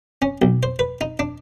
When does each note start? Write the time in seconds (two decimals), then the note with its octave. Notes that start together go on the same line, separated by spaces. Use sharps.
0.22 C#4
0.42 B1
0.63 C5
0.79 B4
1.01 D#4
1.19 D4